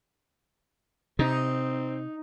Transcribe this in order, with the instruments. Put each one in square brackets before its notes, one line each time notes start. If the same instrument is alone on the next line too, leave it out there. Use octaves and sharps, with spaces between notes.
[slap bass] C3 [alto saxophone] C4 [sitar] D#4